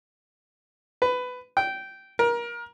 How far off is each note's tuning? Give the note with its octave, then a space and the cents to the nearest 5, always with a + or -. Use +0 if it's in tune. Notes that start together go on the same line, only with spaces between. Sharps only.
B4 +15
G5 -15
A#4 +25